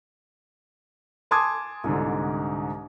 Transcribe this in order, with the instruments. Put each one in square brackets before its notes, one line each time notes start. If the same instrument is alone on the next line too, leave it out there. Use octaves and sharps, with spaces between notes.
[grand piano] G#5 A5 C6 D6 D#6 G#6
C2 G#2 D3